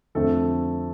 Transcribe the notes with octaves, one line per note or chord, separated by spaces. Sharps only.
F2 D3 A3 C4 A4